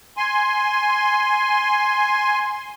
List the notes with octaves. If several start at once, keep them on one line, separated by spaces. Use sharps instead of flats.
G#5 C6